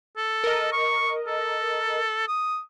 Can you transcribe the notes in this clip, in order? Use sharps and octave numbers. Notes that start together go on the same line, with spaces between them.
A4
A#4 D#5
C#6
A4
D#6